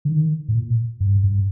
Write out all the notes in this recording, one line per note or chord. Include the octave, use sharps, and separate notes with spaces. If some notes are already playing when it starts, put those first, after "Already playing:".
D3
D#3
A2
A#2
G2
G2